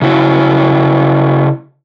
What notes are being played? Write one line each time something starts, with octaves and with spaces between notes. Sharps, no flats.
C#3 E4 F#4